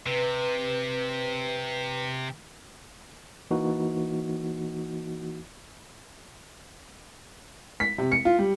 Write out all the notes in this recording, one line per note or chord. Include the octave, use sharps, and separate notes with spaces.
C3 B4
E3 A#3 D#4 F#4
B6
C3
C#7
F4
G3